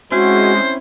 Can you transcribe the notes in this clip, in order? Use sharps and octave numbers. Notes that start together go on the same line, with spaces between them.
G#3 C4 C#4 E4 F#4 C5